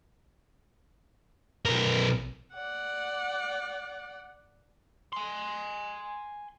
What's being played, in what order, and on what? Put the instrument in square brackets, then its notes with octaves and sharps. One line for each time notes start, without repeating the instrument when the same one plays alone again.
[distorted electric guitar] B1 A#4
[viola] D5 F#5
[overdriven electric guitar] G#5 C6